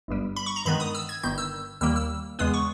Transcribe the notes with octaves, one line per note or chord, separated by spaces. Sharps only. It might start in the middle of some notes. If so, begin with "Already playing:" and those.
G1 G2 G3
B5
C#6
A#5
G2 D#3 G#3 B3 B5
D#6
E6
G#6
G1 G2 D#3 G6
E6
D#2 D#3 G3 A#3 E6
E6
E2 C#3 G#3 B3 D#6
C#6